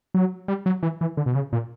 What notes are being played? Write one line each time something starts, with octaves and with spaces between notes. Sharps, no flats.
F#3
G3
F#3
E3
E3
D3
B2
C#3
A#2